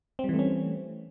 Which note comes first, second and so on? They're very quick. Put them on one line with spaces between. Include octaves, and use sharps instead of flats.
C4 G3 E3 A3 C#4